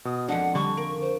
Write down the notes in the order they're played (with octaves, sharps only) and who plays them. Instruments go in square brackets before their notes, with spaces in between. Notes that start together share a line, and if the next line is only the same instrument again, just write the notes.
[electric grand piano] B2 [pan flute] D#6
[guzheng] F2 G#3 [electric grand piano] D4 [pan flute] F#5
[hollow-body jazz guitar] D3 [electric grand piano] G3 [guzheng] D4 [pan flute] C#6
[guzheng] A#3 [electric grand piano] D7
[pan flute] C5